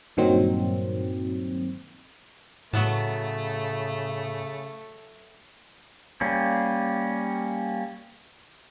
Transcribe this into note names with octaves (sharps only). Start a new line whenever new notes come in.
G2 A#2 D#3 F#3 C4
A2 C#3 F#3 A3 B3 A5
G3 A#3 C#4